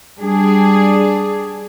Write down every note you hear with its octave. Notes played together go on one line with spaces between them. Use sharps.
G3 D4 G#4